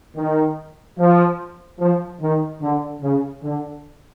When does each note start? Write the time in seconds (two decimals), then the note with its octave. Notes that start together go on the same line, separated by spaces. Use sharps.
0.16 D#3
0.99 F3
1.79 F3
2.21 D#3
2.61 D3
3.02 C#3
3.43 D3